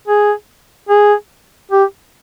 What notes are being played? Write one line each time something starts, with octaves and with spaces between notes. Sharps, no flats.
G#4
G#4
G4